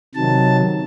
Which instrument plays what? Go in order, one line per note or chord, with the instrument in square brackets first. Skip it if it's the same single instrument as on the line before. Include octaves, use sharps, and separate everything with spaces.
[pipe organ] C3 D#3 F#3 A5